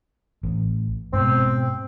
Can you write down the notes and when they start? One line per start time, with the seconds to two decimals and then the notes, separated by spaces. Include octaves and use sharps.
0.43 A1
1.13 G#2 B2 C4